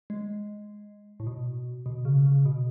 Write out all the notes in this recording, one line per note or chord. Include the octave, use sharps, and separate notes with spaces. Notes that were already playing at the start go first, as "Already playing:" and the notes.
G#3
A2
B2
B2
C#3
C#3
B2